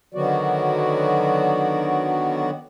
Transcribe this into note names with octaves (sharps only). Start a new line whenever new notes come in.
D3 D#3 F#3 B3 F#4 D5